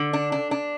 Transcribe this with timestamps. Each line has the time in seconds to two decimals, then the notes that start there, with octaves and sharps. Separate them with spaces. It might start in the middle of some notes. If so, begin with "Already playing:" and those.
Already playing: D3
0.13 D4
0.32 D4
0.51 D4